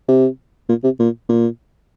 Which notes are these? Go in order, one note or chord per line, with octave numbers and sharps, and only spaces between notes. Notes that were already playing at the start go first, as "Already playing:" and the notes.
C3
A#2
C3
A#2
A#2